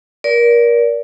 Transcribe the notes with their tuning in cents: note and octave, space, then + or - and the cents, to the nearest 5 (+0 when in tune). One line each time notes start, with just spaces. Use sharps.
A#4 +25 D5 -20